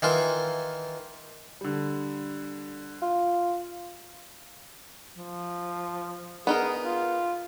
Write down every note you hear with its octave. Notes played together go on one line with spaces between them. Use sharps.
D#3 E3 F4
D3 G3
F4
F3
B3 D#4 G#4 A#4
F4